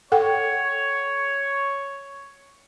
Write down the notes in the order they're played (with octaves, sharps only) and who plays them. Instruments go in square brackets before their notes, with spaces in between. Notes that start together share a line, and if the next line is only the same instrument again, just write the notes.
[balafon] A4 F#5 G5 [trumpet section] C#5